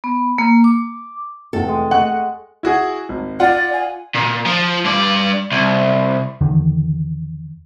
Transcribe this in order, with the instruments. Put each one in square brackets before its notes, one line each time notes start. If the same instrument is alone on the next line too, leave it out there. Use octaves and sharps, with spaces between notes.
[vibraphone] B3
A#3
D6
[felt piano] F1 E2 A3 [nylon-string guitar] A4 [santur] G5
[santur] G#3
[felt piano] A3 D#5 C#6 [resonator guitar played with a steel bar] F#5
[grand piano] E4 F#4 G#4
G#1
[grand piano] F4 F#5 [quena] D5
[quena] G#5
[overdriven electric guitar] A#2
F3
G2 D5
C2
[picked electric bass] E2 D3 D#3